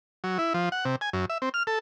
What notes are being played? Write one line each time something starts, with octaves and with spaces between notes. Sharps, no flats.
F#3
E4
F3
F#5
C3
G#5
F#2
E5
C4
F6
A4